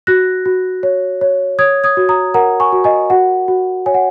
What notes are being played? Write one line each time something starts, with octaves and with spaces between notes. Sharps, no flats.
F#4 F#6 A#6
F#4
C#5
C#5
C#5 D#6 G#6
D#6 G#6
F#4
A#5 D#6
A#4 F#5 A#5
G#5 C#6
F#4
D#5 G#5
F#4 F#5
F#4
C#5 G#5
F#5